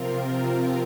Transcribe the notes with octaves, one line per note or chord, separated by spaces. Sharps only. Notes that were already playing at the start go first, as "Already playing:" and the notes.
Already playing: C3 F3 C4 F4 A#4
F4